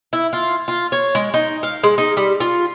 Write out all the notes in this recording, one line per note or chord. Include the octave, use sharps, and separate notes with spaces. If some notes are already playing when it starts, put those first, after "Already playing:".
E4
F4
F4
C#5
G#3
D#4
F5
G#3
D#4
G3
F4